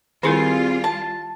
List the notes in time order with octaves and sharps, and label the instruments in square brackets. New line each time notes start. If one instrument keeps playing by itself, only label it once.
[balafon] D#3 E4 A#4 [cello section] G3 F4 [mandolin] C4 G#4
[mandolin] A5